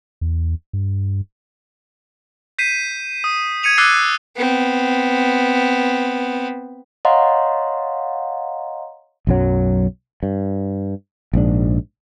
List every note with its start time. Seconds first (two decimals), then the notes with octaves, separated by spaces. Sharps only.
0.21 E2
0.73 G2
2.58 G6 B6 C7 D#7 E7
3.24 D#6
3.63 G#6 C#7 D#7 F7
3.77 D6 E6 F#6 A6 C7 D#7
4.36 B3 C4
7.05 C#5 D#5 F5 F#5 A#5 C6
9.27 B1 F#2 F#3
10.23 G2
11.33 A#1 G#2 D4